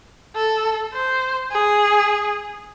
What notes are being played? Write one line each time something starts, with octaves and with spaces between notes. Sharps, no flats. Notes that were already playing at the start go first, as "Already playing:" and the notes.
A4
C5
G#4